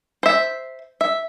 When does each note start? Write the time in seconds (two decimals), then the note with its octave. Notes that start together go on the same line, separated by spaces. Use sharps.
0.23 C5 E5
1.01 E5